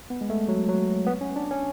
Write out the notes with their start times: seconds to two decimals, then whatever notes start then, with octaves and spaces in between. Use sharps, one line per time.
0.10 B3
0.21 G#3
0.30 A3
0.49 F#3
0.69 F#3
1.07 B3
1.21 C#4
1.36 D4
1.51 C#4